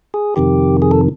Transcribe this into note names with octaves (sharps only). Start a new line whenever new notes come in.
G#4
F2 C3 D#3 G4
G#4
A4